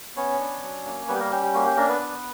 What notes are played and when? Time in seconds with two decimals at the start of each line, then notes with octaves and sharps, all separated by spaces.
0.16 B3 C#4 C#5
0.40 D4
0.62 F#3
0.86 A#3
1.08 G3 B3 B4
1.15 G4
1.19 A#3 A#4
1.31 C#4 G4
1.43 G4
1.54 A#3 F#4
1.66 G4
1.77 A#3 D4 A#4
1.88 B3 B4
2.00 B3